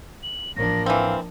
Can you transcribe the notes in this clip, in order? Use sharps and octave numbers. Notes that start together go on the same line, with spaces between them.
F#7
A1 F3 A#3 D4 F4 A#6
E3 C4 F5